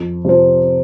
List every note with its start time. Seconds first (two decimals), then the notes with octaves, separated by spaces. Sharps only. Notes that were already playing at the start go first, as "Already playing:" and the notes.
Already playing: F2
0.24 C3 F3 C4